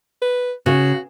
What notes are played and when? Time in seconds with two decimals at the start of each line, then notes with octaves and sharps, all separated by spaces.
0.22 B4
0.66 C#3 F#4